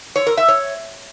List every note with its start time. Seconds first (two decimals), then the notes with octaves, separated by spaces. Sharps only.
0.16 C#5
0.27 A#4
0.37 E5
0.48 C#5